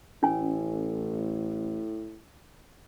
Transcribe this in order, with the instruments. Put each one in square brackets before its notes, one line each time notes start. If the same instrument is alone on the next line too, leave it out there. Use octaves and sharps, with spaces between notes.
[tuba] A1 [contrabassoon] A2 [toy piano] C#4 G#5